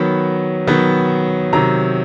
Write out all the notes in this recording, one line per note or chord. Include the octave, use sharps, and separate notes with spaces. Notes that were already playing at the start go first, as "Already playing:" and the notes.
Already playing: D#3 F#3 B3 B5
D#3 F#3 B3
C3 D#3 F#3 A#5